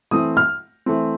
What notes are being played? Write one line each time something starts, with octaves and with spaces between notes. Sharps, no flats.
E3 A3 C4 D#6
F6
E3 A3 C4